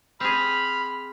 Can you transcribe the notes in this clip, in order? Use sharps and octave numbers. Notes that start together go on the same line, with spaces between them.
C4 G#4 B5 F6